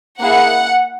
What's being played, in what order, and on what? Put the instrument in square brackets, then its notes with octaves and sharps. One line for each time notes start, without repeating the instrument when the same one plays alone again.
[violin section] A#3 E4 G#4 F#5